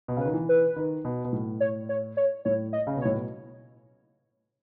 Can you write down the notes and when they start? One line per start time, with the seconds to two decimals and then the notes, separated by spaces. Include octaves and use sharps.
0.08 B2
0.17 C#3
0.20 B4
0.25 D#3
0.34 E3
0.49 B4
0.76 D#3
1.05 B2
1.25 B2
1.33 A2
1.60 C#5
1.89 C#5
2.17 C#5
2.45 A2 C#5
2.73 D#5
2.87 C#3
2.97 B2
3.01 C#5
3.05 A2
3.14 B2